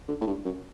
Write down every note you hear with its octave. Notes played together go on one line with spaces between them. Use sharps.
D3
A2
G2
F#2